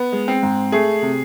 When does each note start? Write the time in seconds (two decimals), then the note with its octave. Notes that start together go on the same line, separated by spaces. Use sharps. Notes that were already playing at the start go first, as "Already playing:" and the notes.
Already playing: B3
0.12 G#3
0.28 C4
0.43 G#2
0.72 A3 G#4
1.02 C3